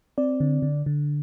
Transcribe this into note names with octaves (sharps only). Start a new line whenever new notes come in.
C4 D5
D3
D3
D3